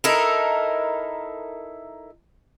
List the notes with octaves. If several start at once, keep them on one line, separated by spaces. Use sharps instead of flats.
D#4 E4 A4 A#4